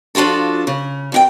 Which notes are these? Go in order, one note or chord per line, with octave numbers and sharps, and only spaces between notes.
F3 D4 F4 F#4 A4
C#3
F2 F#4 G5